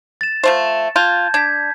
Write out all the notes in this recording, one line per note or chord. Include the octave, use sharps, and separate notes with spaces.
A6 E7
F3 A3 C5
F4 A5 G6 G#6
D4 G#6 B6